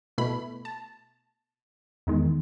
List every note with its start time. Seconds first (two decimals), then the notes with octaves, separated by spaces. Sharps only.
0.18 B2 A3 E4 B5
0.65 A5
2.07 E2 D#3 G#3